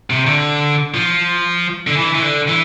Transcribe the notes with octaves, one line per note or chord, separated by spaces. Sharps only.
C3
D3
F3
D3
E3
E3
D3
E3